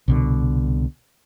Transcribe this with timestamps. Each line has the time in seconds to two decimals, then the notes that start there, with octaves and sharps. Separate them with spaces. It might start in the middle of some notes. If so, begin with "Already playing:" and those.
0.08 C2 B2 D3